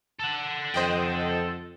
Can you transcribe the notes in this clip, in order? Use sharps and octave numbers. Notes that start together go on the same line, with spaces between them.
A4 F#5
F2 C5 D#5 G5